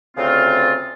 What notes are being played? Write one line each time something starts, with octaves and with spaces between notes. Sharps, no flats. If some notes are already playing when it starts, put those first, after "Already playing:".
D2 C#3 C4 F4